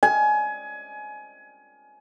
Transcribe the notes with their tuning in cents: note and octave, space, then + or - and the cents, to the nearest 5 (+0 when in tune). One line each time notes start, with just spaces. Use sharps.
G#5 +25